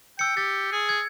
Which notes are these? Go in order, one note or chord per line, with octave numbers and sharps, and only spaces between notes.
G5 E6 C#7
G4 A6
G#4
G#6